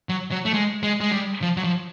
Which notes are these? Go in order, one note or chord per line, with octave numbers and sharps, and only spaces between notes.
F#3
F#3
A3
G#3
G#3
G#3
G3
F3
F#3
F3